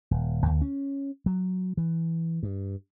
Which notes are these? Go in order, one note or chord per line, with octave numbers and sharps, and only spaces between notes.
D#1
D2
C#4
F#3
E3
G2